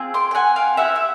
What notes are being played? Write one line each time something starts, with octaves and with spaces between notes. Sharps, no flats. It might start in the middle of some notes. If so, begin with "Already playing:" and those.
Already playing: C4 F4 G#4
C6 D6
G5
F#5 G#5
F5 G5
C4 E4 G4 E5 F#5
E5